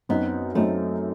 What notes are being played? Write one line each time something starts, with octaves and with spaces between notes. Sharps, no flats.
F#2 F#3 B3 C4 D#4
F#2 F#3 A3 C4 D#4